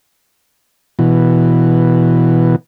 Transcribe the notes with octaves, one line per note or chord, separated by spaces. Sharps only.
B2 E3